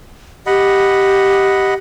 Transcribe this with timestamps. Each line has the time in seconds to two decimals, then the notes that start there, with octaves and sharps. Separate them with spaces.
0.47 G4 D#5 F#5 B5